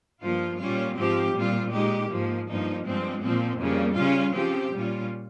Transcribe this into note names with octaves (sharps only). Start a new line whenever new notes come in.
G2 F3 A#3 F4
A#2 G3 C#4 F4
G#2 F3 C4 G4
A#2 G3 C4 F4
A#2 G#3 D#4 G4
G#2 F3 A#3
G2 F3 A#3 D#4
G2 F3 G#3 C4
A#2 F3 C4
F2 C#3 G3 A#3
C#3 G3 C#4 F4
C#3 F3 C4 G4
A#2 G3 C#4 F4